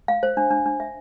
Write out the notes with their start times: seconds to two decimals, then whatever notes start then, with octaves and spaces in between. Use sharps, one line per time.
0.08 F5
0.23 C5
0.37 D4
0.51 D4
0.66 D4
0.80 E5